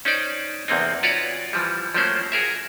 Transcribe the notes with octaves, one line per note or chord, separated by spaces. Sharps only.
C#4 D#4 C5 D5
E2 C3 A#3 C4 D#4
F4 F#4 B4 C#5 D5
E3 F3 G3
F3 F#3 A3 A#3 C#4 C5
F#4 G#4 A#4 E5